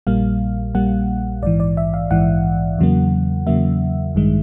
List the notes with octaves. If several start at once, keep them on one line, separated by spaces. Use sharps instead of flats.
A#1 A#2 G3 A#3 F5
A#1 A#2 G3 A#3 F#5
A#1 G#2 E3 D5
D5
E5
F5
A#1 G#2 E3 F#5
E2 C#3 F#3 A#3
E2 C#3 F#3 A#3 E5
A1 G2 D#3 G#3